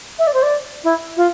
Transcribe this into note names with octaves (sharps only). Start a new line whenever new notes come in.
E5
D5
C5
D5
E4
F4